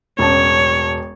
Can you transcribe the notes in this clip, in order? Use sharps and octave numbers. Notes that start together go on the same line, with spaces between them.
E1 A1 C#5 A5